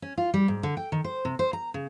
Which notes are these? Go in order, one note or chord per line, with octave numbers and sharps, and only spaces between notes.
C#4
F4
G3
G#2
D3
G5
D#3
C5
C3
C5
A#5
C#3